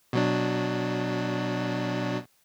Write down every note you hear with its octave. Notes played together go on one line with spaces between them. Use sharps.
B2 F#3 D4